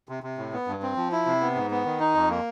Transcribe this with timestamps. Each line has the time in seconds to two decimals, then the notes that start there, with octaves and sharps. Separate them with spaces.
0.09 C3
0.23 C3
0.38 A2
0.53 B3
0.67 G2
0.82 C4
0.96 F3
1.12 E4
1.26 C3
1.41 B3
1.55 G#2
1.71 B3
1.85 D#3
2.00 D#4
2.15 F2
2.30 A#3